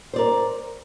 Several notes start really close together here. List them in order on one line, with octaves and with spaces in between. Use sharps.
C5 D5 A#4